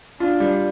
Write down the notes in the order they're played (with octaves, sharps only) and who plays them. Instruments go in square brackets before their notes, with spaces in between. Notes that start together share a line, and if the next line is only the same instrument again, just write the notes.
[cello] D4 [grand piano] F4
[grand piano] G3